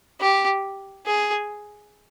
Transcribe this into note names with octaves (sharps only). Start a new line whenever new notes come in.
G4
G#4